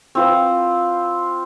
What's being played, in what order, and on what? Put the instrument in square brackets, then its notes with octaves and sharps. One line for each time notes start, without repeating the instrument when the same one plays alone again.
[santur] C4 F4 B4